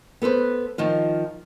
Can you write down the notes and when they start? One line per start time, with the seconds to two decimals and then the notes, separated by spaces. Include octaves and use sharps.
0.22 B3 A4 B4 C5
0.78 D#3 F3 F4